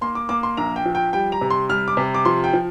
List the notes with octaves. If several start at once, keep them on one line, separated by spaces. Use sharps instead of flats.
A#3 C6
D6
A#3 D6
C6
A#1 A#5
G5
F3
G5
G3 G5
A#5
C3
C6
G3 F6
D6
C3
D6
F3 C6
G5
F3